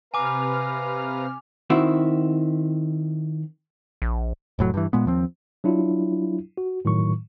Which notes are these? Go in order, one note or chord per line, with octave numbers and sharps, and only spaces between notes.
C3 B4 F5 G#5 A#5 D6 F6
D#3 C4 E4 F#4
A#1
F1 A2 F#3
G2 E3
A#2 G#3 B3
D#2 F3 C4
F#3 D4 E4 F4
F#4
A2 D#3 F#3 C#6